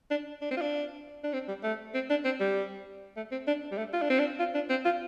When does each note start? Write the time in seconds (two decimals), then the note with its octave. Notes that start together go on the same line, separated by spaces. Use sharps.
0.11 D4
0.41 D4
0.51 C4
0.57 F4
0.61 D4
1.24 D4
1.33 C4
1.48 G3
1.63 A3
1.94 C4
2.10 D4
2.25 C4
2.40 G3
3.16 A3
3.32 C4
3.47 D4
3.72 G3
3.78 A3
3.93 F4
4.02 D4
4.10 C4
4.19 D4
4.39 F4
4.54 D4
4.70 C4
4.85 F4